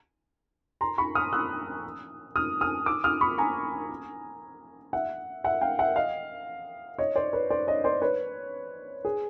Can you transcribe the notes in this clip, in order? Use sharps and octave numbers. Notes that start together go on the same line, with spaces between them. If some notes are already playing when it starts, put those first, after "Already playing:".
A#5 C6
B5 C#6
D#6 F6
E6 F#6
D#6 F6
D#6 F6
D6 E6
D#6 F6
B5 C#6
G#5 A#5
E5 F#5
E5 F#5
F5 G5
E5 F#5
D#5 F5
C#5 D#5
C5 D5
B4 C#5
C5 D5
C#5 D#5
C5 D5
B4 C#5
G#4